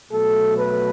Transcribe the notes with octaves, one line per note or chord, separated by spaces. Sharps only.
B2 F#3 A3 A4
B4